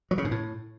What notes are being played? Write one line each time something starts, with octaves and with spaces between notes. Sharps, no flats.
F#3
C#3
G#2
A2